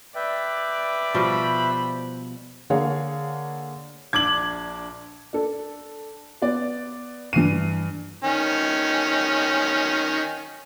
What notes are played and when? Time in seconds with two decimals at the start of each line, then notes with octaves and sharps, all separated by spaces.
0.15 B4 D5 E5 G5
1.14 B2 F3 G3 C5 B5
2.70 D3 A#3 G#4 C#5 F5
4.13 A#1 D4 D6 G#6 F#7
5.33 D4 A4
6.42 B3 D5
7.33 G2 E3 C7 D#7
8.24 D#3 C#4